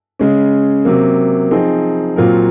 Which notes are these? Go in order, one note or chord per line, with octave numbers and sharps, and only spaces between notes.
C#3 G#3 C#4
C3 F#3 A#3
F3 C4 D#4 G#4
A#2 F#3 C4 F4 A#4